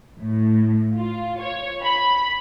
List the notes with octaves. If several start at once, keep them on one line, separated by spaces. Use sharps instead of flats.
A2
F4
C#5
B5